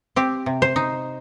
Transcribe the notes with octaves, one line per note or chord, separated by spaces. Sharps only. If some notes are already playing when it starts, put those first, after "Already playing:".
C4 G4
C3
C5
D#4